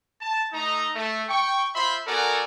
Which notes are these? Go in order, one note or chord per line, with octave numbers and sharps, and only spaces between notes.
A5
A3 D#4 A#5
A3
G5 C#6
F4 C5 E5 B5 C6
B3 F#4 A4 A#4 D5 G#5